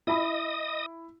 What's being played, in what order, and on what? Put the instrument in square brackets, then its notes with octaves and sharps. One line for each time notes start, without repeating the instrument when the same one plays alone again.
[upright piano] E4 B5 [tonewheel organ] D#5 D#6